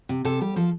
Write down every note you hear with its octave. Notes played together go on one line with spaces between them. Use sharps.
C3
C3 A4
G3 G4
F3 A4